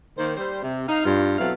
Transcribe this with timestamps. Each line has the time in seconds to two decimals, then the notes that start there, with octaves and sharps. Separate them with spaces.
0.17 D#3 A#3 C5
0.37 G3 C5
0.63 C3
0.89 D#4 F5
1.05 G2 F4
1.38 B2 F#3 C4 E4 A4 F5